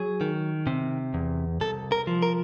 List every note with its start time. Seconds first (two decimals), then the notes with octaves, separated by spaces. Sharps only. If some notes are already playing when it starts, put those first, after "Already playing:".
Already playing: F#3 G#4
0.21 D#3
0.67 C3
1.14 E2
1.60 C2 A4
1.92 A#4
2.07 F3
2.22 A#4